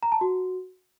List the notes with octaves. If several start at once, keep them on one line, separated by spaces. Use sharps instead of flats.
A#5
A5
F#4